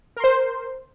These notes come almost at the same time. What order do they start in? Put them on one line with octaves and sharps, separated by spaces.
A#4 C6 C5